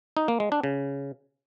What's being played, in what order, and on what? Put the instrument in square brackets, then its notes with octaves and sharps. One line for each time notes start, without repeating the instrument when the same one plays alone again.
[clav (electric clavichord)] D#4
A#3
G#3
D4
C#3